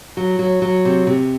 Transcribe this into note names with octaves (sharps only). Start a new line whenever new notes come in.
F#3
F#3
F#3
C3
C3